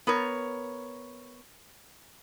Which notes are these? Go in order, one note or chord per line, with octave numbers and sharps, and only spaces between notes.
B3 A#4 C#5